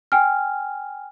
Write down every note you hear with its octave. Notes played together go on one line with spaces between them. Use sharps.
G5 G#5 F6